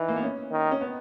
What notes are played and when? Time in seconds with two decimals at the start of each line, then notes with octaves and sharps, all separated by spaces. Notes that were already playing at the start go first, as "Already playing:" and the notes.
Already playing: E3 D#4
0.08 A#3
0.16 B3
0.23 C#4
0.51 D#3
0.71 C#4
0.81 B3